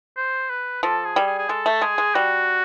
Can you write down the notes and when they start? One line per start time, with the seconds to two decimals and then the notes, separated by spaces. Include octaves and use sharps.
0.17 C5
0.50 B4
0.83 F3 A4
1.05 G#4
1.16 G3
1.27 G#4
1.38 G#4
1.49 G#3 A4
1.66 A3
1.81 G#3 G#4
1.98 G#3
2.15 G3 F#4